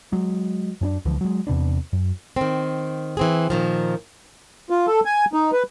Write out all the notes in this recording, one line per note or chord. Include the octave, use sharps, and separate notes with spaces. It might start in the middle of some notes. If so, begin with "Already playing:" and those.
F#3 G#3
F#2 C#4 D4
C#2 D3 E3 F3
F#3 G#3
E2 C3 B3 D4
F#2
D#3 C4
E3 C4 G#4
A#2 D#3 F3
F4
A4
G#5
D#4
B4